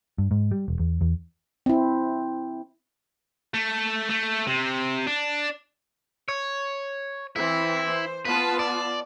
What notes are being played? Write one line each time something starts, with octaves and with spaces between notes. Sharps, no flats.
G2
G#2
G3
E1
E2
E2
C4 E4
A3
A3
C3
D4
C#5
E3 C4 E4
C5
B3 F4 B4 A5
D5